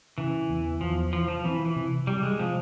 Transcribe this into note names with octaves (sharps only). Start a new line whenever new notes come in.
C#3 E3
E2
E2 F3
E3 F3
F3
E3 C4
E3
C3
C3 G3
G#3
C3 F3